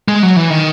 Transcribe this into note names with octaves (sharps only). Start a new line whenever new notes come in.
G#3
F#3
E3
D#3